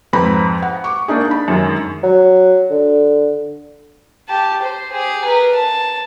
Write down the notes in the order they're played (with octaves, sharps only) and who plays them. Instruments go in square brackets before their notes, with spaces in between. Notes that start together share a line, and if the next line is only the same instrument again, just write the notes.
[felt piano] F2 G#2 C4 B4 A#5 B5
F#5
C#6 D6
A#3 D4 D#4 G#4
D4 B5
F#2 D#3 G#3
[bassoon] F#3
D3
[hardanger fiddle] G4 A5
C5
G4 G#4
A#4 B4
A5